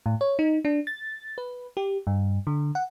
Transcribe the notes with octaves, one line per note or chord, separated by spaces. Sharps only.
A2
C#5
D#4
D4
A6
B4
G4
G2
D3
F#5